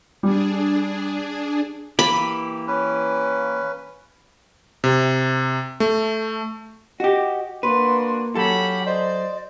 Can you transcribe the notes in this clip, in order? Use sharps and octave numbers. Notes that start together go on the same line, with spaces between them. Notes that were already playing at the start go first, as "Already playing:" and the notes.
G3 D4 G#4
E3 A#3 G4 B5
C#4 B4
C3
A3
F#4 G4 D#5
A#3 D4 F#4 B4 C6
F#3 C#4 G4 A4 F#5 B5
C5 D5 D#5